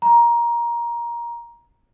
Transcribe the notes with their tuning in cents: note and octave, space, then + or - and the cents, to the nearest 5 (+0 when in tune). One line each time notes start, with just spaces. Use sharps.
A#5 +15